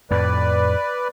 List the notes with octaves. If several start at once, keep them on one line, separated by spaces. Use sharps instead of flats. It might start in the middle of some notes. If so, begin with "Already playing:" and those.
F2 A2 B4 D5